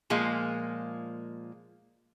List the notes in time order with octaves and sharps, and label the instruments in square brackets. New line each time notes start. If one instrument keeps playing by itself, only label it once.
[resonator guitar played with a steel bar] A#2 F3 G#3 A#3